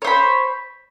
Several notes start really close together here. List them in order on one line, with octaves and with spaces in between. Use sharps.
C#5 C5 B5